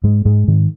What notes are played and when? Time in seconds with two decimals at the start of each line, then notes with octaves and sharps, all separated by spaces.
0.04 G#2 G#3
0.25 G#2 G#3
0.48 G#2 D#3